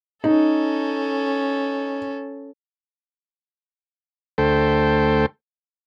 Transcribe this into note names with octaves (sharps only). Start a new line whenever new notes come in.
C#4 D#4 A4
D2 A3 A4 C5 G5